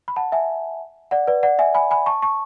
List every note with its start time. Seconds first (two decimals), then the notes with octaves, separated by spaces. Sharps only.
0.08 B5
0.16 F#5 A5
0.32 E5 G#5
1.11 D5 F#5
1.27 B4 D5
1.43 D5 F#5
1.59 E5 G#5
1.75 G#5 B5
1.91 G#5 B5
2.06 A5 C#6
2.22 A5 C#6